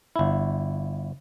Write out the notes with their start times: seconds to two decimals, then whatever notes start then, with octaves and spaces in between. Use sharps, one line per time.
0.16 G1 E4